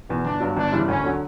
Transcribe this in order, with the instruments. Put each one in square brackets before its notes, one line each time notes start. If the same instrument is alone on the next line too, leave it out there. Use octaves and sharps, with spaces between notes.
[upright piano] E2 B2
[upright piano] G1 [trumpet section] D4
[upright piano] G2 F#3
[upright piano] G1 [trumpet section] D4
[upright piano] F#2 C#3 E3 G3
[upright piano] D2 [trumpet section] C#4
[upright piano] D3 F#3